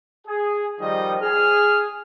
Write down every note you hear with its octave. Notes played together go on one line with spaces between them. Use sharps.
G#4
D#3 F3 G3 D#5
G#4 F6